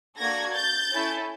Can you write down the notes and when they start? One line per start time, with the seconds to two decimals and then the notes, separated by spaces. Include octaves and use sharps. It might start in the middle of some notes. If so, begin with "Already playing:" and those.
0.18 A#3 D4 F#4 A4 G#6 A#6
0.55 G6 A6
0.92 C#4 E4 A4